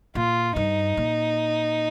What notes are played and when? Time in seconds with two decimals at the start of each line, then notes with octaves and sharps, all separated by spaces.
0.15 A#2 F4
0.56 G2 D#4
0.97 A#2